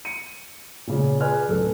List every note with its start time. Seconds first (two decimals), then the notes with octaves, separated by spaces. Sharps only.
0.05 C#7 D#7
0.87 A#2 C#3 C#4
1.20 G#4 B4 D5 G#5 F6 F#6
1.49 D1 F#2 A4 F#6